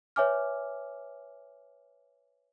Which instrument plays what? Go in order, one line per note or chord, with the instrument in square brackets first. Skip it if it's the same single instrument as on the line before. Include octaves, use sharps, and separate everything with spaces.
[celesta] B4 C#5 E5 G#5 D6 F6